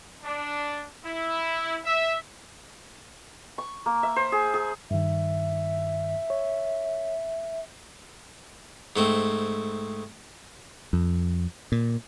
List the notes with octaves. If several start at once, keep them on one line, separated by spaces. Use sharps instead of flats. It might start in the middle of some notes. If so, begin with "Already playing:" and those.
D4
E4
E5
C#6
A#3
E5
C5
G#4
G#4
G2 D#3 E5
C#5
G#2 A3 C4
F2
A#2